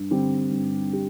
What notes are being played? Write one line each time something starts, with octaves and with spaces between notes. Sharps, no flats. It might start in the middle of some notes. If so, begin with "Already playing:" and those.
Already playing: G2
D3 G3 C4 G4
G2
G4